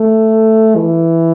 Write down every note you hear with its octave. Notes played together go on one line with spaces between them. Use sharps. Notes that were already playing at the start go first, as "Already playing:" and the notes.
Already playing: A3
E3